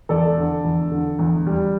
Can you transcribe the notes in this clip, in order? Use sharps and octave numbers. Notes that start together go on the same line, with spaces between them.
E2 A4 D5
D3
E2
D3
E2
G3